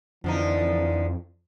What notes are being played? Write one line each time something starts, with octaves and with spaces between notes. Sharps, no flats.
F2 D3 E3 F3 D#4